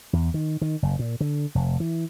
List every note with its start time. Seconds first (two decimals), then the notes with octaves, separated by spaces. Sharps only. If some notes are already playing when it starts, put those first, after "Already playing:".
0.13 E2
0.34 D#3
0.62 D#3
0.83 F#1
0.99 A#2
1.21 D3
1.55 F1
1.80 E3